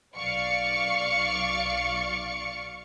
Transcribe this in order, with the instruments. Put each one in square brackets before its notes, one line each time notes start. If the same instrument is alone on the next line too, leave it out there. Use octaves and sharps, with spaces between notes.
[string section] B1 D5 F5 C#6 C#7